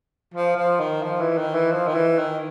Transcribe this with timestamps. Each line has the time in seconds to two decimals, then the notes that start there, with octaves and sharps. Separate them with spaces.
0.34 F3
0.56 F3
0.80 D#3
1.03 F3
1.20 E3
1.38 D#3
1.55 E3
1.72 F3
1.88 D#3
1.95 E3
2.18 D#3